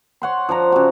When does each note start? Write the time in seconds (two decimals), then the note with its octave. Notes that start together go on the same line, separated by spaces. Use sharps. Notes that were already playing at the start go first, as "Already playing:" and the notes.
0.22 C#5 F#5 C6
0.49 F3 D4 F#5 A#5
0.72 C#3 F#4